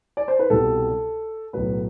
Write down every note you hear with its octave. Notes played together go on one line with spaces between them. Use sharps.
D5
C5
B4
C2 B2 G3 A4
B1 A2 F#3 B4